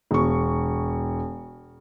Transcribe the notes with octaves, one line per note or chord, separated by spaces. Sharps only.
E1 C#6